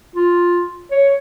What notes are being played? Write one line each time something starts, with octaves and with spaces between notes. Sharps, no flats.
F4
C#5